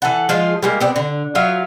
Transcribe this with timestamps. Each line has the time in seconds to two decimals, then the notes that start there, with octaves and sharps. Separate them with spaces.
0.02 E3 A4 F#5
0.29 F3 G#3 F4 G#4
0.63 G3 G#3 A#3
0.80 B3 C4 D4
0.96 D3
1.35 F#3 F4 E5 F5